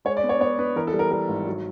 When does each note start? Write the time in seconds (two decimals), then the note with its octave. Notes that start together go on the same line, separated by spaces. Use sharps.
0.05 G#3 C#5
0.17 D5
0.23 B3
0.29 C#5
0.40 B3 C#5
0.59 B3 B4
0.76 E3 A#4
0.87 A4
0.93 G3
0.99 A#4
1.11 G3 A#4
1.28 G#1
1.47 F#3